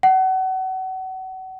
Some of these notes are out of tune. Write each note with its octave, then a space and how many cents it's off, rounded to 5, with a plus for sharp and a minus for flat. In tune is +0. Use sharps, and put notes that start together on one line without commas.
F#5 +30